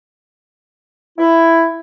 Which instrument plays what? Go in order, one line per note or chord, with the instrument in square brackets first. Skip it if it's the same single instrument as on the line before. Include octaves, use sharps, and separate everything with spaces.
[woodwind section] E4